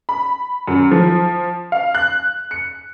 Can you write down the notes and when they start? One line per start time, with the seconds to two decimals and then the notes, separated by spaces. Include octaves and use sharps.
0.09 B5
0.68 F#2
0.91 F3
1.72 F5
1.95 F#6
2.51 C#7